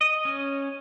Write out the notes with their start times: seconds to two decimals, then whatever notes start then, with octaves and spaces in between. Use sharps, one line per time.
0.01 D#5
0.25 C#4